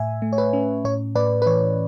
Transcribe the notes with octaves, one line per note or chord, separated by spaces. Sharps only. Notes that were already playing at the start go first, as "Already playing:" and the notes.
Already playing: A2 E5 G#5
A3
C#5
B4
C#4
A2 C#5
A2 B4 D5
B4
E3 C#5